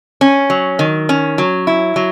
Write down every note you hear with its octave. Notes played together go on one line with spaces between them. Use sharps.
C#4
F#3
D#3
C#4
F#3
E4
F#3